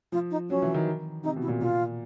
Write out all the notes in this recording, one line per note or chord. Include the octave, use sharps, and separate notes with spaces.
F3 F4
D#4
F#3 C#4
E3
D#3
C3 D#4
B2
E4
A#2
A#2 F4